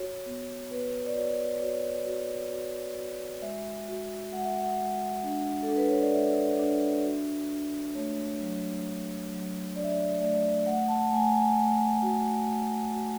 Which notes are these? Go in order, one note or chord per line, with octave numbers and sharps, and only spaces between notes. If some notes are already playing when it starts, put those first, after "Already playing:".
Already playing: F#4 C#5
B3
B3 B4
D5
F#4 C#5
F#4 C#5
F#4
F#4
F#4
G#3 E5
F#4
G#3 F#5
E5
F#5
G#3
D4
A4
D4
B4
C#5
D5
G#3 E5
D4
F#4
D4
A3 C#5
F#3
D4
F#3
D4 D5
E5
D5
A3 D5
A3 F#5
A5
A3 G#5
G#5
A3
F#4
A3
F#4